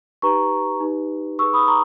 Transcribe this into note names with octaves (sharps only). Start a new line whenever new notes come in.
D#4 G4 B4 A#5 C#6
D#4 G4 B4
D#4 G#4 B4 C#6 E6
B5 D#6
A#5 C#6